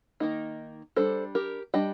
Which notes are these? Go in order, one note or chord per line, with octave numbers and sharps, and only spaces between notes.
D#3 A#3 D#4
G3 D4 A4 C5
G4 A#4
G3 D4 D#5 G5